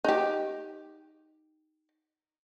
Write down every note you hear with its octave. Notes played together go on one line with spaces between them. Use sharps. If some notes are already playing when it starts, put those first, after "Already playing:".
D#4 G4